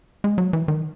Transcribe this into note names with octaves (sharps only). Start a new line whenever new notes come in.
G#3
F#3
E3
D#3